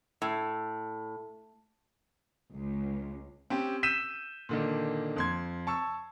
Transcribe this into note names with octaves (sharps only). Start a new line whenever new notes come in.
A2
C#2
C4 C#4 G4
E6 G6 B6 D#7 E7
A#2 D3 D#3
F2 C6 G#6
A5 C#6 E6